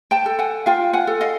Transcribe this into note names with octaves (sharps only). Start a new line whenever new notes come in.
G5 A5
A4
F#5 G#5
F4 F5 G5
F#5 G#5
A4
D#5 F5